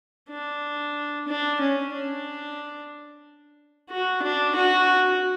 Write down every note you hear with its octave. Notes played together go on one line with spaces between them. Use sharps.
D4
D4
C#4
D4
F#4
D4
F#4